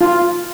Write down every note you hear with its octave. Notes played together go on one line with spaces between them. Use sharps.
F4